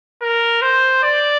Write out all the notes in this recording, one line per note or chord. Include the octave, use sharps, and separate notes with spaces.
A#4
C5
D5